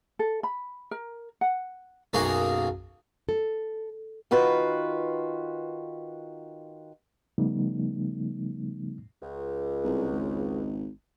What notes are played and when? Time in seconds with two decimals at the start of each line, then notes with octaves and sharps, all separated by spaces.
0.19 A4
0.43 B5
0.91 A#4
1.41 F#5
2.13 B1 F#2 A#3 F#4 G#4
3.29 A4
4.31 D#3 F4 F#4 B4
7.38 C#3 F3 G3 A3 B3 D#4
9.22 C#2
9.84 C2
10.12 G#1